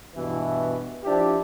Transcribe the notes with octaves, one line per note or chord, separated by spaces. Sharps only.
G2 B2 E3
F3 D4 E4 G4